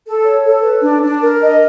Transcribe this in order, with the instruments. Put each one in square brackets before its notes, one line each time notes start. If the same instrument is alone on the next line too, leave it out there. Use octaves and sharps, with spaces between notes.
[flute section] A4
C#5
A4
B4
D4
D4
A#4
D#5